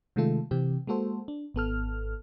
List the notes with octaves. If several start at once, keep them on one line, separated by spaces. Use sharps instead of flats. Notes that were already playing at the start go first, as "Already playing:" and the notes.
C3 D#3 G#3 A3 F4 A4
C3 E3 C4 G4
G#3 A#3 F#4 A4 C5
D4
G#1 B3 A4 F6